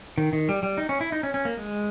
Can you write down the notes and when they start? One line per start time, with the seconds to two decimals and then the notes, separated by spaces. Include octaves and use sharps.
0.18 D#3
0.33 D#3
0.49 G3
0.63 G3
0.78 D#4
0.89 C#4
1.01 E4
1.12 D#4
1.23 C#4
1.34 C#4
1.45 A#3
1.57 G#3